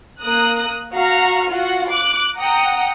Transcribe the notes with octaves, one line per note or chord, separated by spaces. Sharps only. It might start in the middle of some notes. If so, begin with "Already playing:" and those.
A#3 A#4 D#6 F#6
F#4 F5 A#5 F6
F4 F#4 F#5
D6 F#6 D7
F#5 G5 A#5 D#6